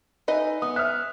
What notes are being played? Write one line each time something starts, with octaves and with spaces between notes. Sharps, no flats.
D#4 B4 D#5 E5 G#5
B3 D#6
E5 F6 F#6